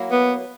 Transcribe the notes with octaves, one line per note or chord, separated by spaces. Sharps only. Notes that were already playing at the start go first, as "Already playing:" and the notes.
Already playing: F#3 A#3 E4
B3